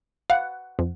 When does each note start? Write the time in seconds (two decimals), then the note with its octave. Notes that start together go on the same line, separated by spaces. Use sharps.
0.30 F5 F#5
0.79 F2